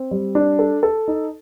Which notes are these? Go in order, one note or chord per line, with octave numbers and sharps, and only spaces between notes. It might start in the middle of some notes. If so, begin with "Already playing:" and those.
Already playing: C4
G3
D4
A4
A4
D#4